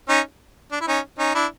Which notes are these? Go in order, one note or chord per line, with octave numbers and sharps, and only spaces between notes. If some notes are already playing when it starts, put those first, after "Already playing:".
C#4 D#4
D4
E4
C#4 D#4
C#4 D#4
D4 E4